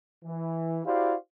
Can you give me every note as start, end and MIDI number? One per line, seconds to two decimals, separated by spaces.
0.25 0.80 52
0.86 1.15 64
0.86 1.15 66
0.86 1.15 67
0.86 1.15 72
0.86 1.15 74
0.86 1.15 77